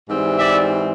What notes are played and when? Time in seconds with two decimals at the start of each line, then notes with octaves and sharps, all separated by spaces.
0.09 G#2 E3 G3 C4
0.37 D5 E5